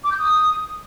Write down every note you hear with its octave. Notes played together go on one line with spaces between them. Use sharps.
D6
G6
D#6